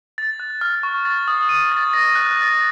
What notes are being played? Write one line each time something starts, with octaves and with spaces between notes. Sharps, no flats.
A6
F#6
F6
C#6
A6
D#6
D#7
A6
A#6
F#6
A6